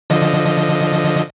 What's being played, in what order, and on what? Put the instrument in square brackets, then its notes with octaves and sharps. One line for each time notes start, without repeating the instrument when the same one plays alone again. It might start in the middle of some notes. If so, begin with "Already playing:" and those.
[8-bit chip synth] D3 F3 D#5